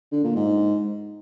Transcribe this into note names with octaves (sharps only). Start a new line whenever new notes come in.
D3
A#2
G#2